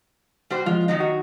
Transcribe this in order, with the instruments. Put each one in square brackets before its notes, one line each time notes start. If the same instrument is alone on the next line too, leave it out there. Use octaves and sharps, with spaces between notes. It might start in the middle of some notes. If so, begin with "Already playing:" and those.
[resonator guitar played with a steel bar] G3 F#4 C5
[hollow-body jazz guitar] F2 F3 G#3 [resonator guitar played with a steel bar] F4
[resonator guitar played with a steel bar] D#3 F#3 D#4
[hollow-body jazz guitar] F#4